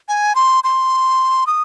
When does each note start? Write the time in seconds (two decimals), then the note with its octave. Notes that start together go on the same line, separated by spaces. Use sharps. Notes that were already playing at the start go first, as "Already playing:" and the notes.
0.08 G#5
0.35 C6
0.64 C6
1.47 D#6